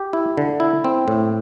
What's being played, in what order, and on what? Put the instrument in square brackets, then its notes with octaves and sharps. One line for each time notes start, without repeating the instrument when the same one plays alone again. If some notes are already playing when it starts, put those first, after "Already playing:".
Already playing: [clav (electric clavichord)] G4
E4
D3
E4
C4
A2